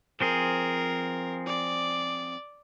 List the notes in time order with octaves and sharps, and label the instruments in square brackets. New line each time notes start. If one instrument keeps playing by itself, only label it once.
[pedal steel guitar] F3 C4 G#4 [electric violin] A#4
[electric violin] D5